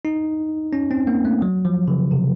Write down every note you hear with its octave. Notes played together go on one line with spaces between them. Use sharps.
D#4
C#4
C4
A#3
A3
F#3
F3
C#3
C3